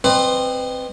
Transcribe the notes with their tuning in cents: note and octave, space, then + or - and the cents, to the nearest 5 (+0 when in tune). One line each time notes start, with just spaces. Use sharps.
C4 +10 B4 +25 D#5 -30